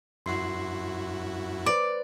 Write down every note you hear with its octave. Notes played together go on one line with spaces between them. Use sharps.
F#2 E4 F#4 C6 C7
B4 C5 D5